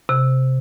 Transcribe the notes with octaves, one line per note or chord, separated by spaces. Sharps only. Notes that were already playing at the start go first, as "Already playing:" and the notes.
C3